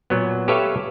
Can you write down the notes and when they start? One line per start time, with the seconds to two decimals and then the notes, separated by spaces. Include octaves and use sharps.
0.10 A#2 F#3 B3
0.48 G4 A4 B4 C#5 E5 F5